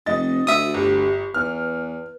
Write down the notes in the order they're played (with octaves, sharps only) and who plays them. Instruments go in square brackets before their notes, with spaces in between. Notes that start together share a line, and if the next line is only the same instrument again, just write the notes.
[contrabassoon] F1 [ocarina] C4 [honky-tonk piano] D#5 A6
[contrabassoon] D2 [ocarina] F#4 [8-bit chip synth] E5 D#6
[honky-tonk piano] G1 [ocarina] G4
[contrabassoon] E2 [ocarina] B4 [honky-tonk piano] F6